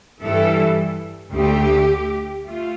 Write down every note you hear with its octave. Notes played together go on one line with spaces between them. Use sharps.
G2 E3 G3 A4
D2 D3 A3 G4
A3 F4